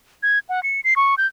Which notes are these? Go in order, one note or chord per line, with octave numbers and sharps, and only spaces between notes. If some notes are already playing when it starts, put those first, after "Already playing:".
G#6
F#5
C#7
C7
C#6
G6